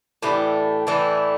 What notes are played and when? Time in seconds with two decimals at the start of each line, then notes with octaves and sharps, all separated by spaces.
0.22 A2 E3 A3 D4 G4
0.87 A2 E3 A3 D4